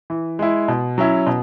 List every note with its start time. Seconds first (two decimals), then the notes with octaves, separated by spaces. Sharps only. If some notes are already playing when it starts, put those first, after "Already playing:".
0.10 E3
0.39 G#3 E4
0.68 B2
0.98 F#3 C#4 E4
1.27 B2